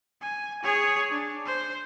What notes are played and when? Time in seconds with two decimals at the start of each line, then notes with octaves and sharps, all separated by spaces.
0.22 G#5
0.63 G#4 C#5
1.11 D4
1.46 C5